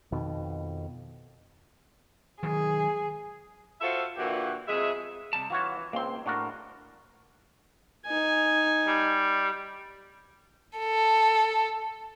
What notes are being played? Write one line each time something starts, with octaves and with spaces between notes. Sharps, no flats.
F2 B2 D#3
D#3 F#3 G#3 G#4
F4 F#4 A4 C5 E5
A#2 D3 E3 F#4 G4
F2 G#3 G#4 E5
C3 G3 A5
E3 F4 F#4 C#5
C#2 A#3 C4 C6
A2 D4 F#4 A#4
D#4 G#5
G3
A4